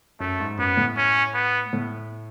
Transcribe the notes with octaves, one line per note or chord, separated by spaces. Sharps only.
F#2 A3
G#2
F#2 B3
A2
C#4
B3
A2